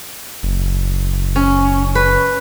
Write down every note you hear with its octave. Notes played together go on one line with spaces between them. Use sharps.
F#1
C#4
B4